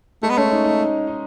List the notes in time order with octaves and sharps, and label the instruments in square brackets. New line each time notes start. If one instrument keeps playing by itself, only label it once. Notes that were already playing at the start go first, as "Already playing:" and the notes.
[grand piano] G#3 [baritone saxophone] A3
[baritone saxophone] B3
[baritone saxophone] A3 [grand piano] C#4
[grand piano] D#4
D#4
D#4
D#4